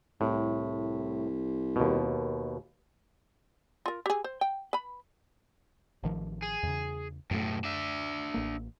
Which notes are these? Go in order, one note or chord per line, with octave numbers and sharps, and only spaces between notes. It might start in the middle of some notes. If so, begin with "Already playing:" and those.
C2 A2
D#2 B2
F4 A#4
G4 G#4
C5
G5
B4 B5
A1 D#3 F3
G#4
E2 C#3
B1 F#2 A2 A3
D4 E5
A1 A#3